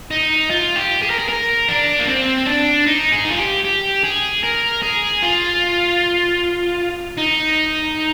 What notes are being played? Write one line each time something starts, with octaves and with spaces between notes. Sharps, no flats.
D#4
F4
G4
G#4
A#4
G#4
A#4
D4
A#3
C4
D4
D#4
G#4
D#4
F4
G4
G4
G#4
A#4
G#4
F4
D#4